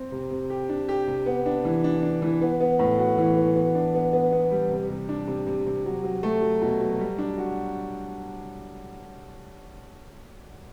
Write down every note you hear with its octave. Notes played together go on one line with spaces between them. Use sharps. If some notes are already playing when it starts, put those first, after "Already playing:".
Already playing: C4
C3
C3
G4
D4
G4
C3
B3
D4
E3
D4
D4
E3
B3
B3
A2
F#4
E3
B3
B3
D4
B3
B3
B3
G3
C3
C3
D4
C3
C3
C3
F#3
F#3
A3
F#3
B2
F#3
G3
D4
F#4